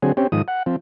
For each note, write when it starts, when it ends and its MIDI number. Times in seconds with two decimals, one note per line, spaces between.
0.02 0.12 50
0.02 0.12 54
0.02 0.12 60
0.02 0.12 68
0.17 0.27 60
0.17 0.27 61
0.17 0.27 67
0.32 0.42 44
0.32 0.42 51
0.32 0.42 53
0.32 0.42 87
0.48 0.63 78
0.66 0.76 53
0.66 0.76 60